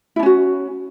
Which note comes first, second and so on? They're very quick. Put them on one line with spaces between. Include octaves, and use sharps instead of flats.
E4 D4 C#4 F#4